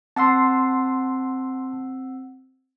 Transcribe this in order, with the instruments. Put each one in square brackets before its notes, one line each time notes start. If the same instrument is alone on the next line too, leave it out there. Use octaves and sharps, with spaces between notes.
[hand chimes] C4 F#5 E6 [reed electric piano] A5 C6